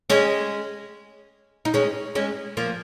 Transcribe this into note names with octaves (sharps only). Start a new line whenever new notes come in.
G#3 C#4
D#4
G#3 C#4
G#3 C#4
F3 A#3